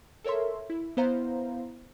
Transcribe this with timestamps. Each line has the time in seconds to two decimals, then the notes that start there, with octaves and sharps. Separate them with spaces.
0.24 A4 A#4 C#5 E5 C6
0.70 E4
0.97 B3 E4 C5 F5 A#5